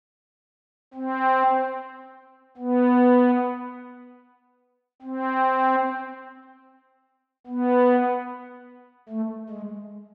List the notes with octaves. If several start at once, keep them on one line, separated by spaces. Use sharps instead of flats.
C4
B3
C4
B3
A3
G#3